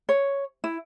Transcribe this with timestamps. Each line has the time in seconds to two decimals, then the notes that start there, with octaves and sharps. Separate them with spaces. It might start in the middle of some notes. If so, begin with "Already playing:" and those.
0.09 C#5
0.64 E4